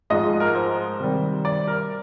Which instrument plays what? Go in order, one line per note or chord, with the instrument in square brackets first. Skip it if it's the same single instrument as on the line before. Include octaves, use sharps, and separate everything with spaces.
[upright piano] G#2 F3 G#3 D#5
A#4
C5
C3 D#3 G3
D5
A#4